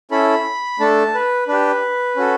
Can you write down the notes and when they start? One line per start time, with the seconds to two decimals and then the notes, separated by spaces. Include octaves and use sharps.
0.11 C#4 E4 A4 B5
0.80 A3 D4 A4 A5
1.14 B4
1.48 D4 G4 B4
2.16 C#4 F#4 A4